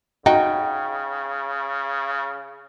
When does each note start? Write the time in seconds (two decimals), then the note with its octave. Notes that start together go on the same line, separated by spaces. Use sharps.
0.26 C#3 D#4 F#4 D#5 G5